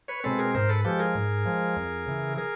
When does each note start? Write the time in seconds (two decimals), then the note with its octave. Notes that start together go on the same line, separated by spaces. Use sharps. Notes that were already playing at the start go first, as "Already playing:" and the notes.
0.08 B4 C#5
0.24 B2 G#3 C4 A4 B4
0.39 G#4 A#4
0.54 G#2 A#4 C5
0.69 A4 B4
0.85 F3 G#3 G4 A4
0.99 G#4 A#4
1.15 G#2
1.45 F3 G#3
1.76 F2
2.06 C#3 E3
2.37 G#4 A#4